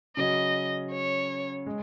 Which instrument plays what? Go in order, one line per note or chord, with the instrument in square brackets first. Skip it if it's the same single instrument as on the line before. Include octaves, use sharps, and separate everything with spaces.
[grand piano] C#3 F#3 C#4 [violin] D#5
[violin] C#5
[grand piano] G#3